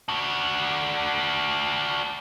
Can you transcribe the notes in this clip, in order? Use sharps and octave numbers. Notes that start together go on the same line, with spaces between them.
D4 F#4